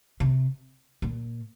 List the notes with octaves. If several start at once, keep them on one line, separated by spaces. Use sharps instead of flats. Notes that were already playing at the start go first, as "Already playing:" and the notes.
C3
A#2